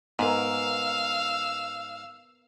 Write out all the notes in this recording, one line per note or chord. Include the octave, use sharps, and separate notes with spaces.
G#2 B3 A#4 F5 E6